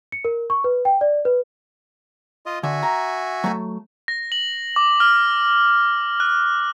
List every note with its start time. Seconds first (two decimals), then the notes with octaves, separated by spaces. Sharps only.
0.12 C#7
0.25 A#4
0.50 C#6
0.64 B4
0.85 G5
1.01 D5
1.25 B4
2.46 F4 D#5
2.63 D3 F#4 E5 G#5
2.83 A#5
3.44 F#3 A3
4.08 A#6
4.32 F#7
4.76 D6
5.00 F6
6.20 F#6